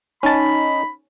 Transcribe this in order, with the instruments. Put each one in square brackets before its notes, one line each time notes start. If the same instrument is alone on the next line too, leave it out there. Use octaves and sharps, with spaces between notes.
[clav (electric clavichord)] C#4 A5 [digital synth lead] D#4 [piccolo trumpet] B5